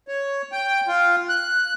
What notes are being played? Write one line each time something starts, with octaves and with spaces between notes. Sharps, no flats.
C#5
G5
F4
F#6